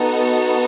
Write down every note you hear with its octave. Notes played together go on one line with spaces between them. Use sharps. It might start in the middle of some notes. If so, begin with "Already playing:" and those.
Already playing: B3 D#4 F#4 A4